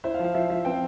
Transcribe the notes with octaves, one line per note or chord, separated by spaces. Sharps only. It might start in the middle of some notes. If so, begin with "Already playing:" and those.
E4 C5
F5
F3
F5
F3 E5
F3 E5
C4 G5